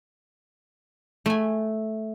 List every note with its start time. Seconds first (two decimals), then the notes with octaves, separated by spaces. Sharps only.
1.26 A3 G#5